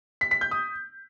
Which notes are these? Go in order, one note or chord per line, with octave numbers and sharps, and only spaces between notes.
B6
B6
G6
D#6